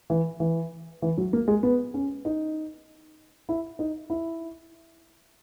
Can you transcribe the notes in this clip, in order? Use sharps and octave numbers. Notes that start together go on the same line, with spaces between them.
E3
E3
E3
F#3
A#3
G#3
B3
C#4
D#4
E4
D#4
E4